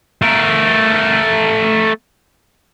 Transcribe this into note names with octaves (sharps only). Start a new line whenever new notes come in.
A3 A#4